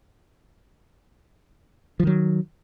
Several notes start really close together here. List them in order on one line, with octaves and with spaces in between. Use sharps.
F3 D#3 F#3